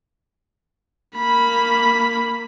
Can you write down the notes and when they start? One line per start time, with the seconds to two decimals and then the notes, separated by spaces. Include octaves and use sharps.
1.16 A#3 B5